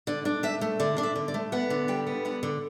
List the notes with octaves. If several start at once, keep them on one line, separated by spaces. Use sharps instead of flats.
D3 D5
D4
A3 E5
A3
D3 D5
D4
E5
D3
D5
A3
B3 F#5
D3
G3 G5
B3
D3 F#5
D3